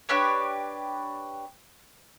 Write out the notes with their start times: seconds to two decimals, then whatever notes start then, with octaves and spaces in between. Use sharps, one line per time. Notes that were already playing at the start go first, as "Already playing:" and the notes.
0.09 D4 G4 B4 C#5